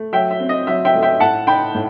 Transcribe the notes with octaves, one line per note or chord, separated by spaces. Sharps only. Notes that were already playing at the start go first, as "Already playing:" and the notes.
Already playing: A3
F#3 E5 G5
E5
C4
D#5
F#3 E5
E5 G5
A3
E5 G5
A2 F#5 A5
D#4 G5 B5
A2